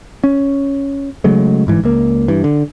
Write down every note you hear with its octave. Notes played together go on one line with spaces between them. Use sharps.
C#4
C#3 F#3 G#3 A3
G1 G#2 E3
C#2 A#3
G2 E3
D3